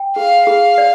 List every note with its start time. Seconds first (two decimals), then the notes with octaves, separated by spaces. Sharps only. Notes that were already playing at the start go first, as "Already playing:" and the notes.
Already playing: G5
0.16 G#4 F5
0.47 G#4 F5
0.78 D5